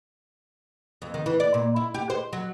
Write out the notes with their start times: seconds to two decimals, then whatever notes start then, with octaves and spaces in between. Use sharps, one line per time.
1.02 F2
1.14 D#3
1.26 E3
1.40 D5
1.54 A#2
1.76 E4
1.94 G4
2.10 C5
2.33 F#3